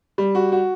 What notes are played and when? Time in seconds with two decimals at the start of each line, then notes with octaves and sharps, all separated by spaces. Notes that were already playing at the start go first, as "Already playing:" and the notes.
0.18 G3
0.35 F#4
0.52 F#4